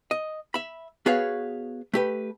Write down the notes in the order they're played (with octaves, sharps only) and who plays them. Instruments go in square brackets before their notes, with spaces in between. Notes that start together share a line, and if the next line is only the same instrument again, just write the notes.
[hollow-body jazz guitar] D#5
E5 B5
B3 F#4 G#4 B4 C#5 F5
A3 G4 B4